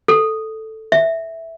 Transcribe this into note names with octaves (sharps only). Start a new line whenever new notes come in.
A4
E5